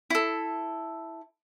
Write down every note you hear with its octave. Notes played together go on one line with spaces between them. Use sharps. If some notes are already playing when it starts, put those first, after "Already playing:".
E4 A4